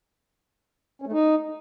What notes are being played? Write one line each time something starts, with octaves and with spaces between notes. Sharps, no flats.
C#4
A3
D#4